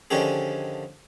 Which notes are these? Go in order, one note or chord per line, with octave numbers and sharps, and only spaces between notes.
D3 D#3 F3 C#4 G4 G#4